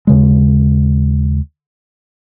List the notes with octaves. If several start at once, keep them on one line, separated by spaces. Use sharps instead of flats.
D#2 C#3 G#3